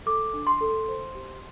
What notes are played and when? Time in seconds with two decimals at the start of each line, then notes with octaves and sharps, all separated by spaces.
0.06 A4 D6
0.33 D4
0.47 C6
0.61 A4
0.88 C5
1.15 G4